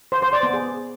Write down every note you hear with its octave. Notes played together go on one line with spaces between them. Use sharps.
C5
C5
D5
B3
G#4